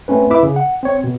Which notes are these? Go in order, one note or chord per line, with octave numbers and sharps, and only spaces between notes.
A3 C4 C#4 B4
E4 B4 E5 D6
C#3
F#5
C4 C#5
B2